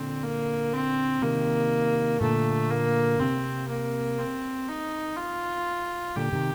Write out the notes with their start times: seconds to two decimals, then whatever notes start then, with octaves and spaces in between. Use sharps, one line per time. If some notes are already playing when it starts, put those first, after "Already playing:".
Already playing: A#2 D3 C4
0.23 A#3
0.73 C4
1.22 C3 D#3 A#3
2.21 A#2 D3 A3
2.70 A#3
3.19 C3 C4
3.69 A#3
4.19 C4
4.68 D#4
5.17 F4
6.16 A#2 D3 G4
6.33 C3 D#3